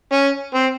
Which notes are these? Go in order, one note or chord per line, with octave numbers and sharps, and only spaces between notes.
C#4
C4